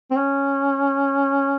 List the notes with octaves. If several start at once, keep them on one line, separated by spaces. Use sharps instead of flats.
C4
C#4